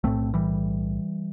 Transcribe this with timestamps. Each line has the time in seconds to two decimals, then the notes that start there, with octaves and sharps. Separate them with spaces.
0.04 B1 A2 A3 C4
0.34 E3 G3